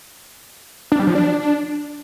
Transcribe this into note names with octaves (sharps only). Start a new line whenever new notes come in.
D4
G3
F3
D4